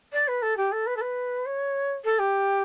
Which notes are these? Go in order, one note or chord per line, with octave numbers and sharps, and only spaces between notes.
D5
B4
A4
G4
A4
B4
A4
B4
C#5
A4
G4